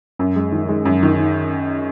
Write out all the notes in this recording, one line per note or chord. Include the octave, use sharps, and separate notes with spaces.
F#2
G#3
D#3
G#3
F#2
D#3